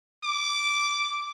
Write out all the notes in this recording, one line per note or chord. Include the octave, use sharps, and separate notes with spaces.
D6